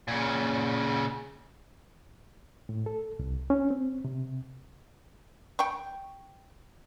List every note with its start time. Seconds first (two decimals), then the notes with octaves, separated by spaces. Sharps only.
0.08 A#2 C#3
2.69 A2
2.86 A4
3.19 C2
3.50 C#4
3.70 C4
4.05 C3
5.59 G5 C#6